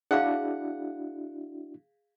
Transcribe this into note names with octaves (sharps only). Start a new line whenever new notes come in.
D4 E4 F#4 G#4 F5 F#5